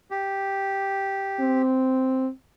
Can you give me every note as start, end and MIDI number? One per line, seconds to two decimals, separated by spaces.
0.11 1.62 67
1.40 2.29 60